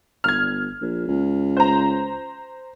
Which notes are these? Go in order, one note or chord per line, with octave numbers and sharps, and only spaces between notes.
G1 F6 G#6
A#1
C#2
C5 A#5